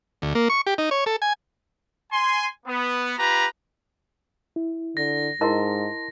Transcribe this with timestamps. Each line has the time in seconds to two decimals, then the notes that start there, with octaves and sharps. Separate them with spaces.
0.22 D2
0.35 A#3
0.50 C#6
0.67 G4
0.78 D#4
0.91 C#5
1.06 A4
1.22 G#5
2.11 G#5 C6
2.66 B3
3.18 F4 G4 B4 A#5
4.56 E4
4.97 D3 A#6
5.41 G#2 E4 A#4 D#5 A5 C6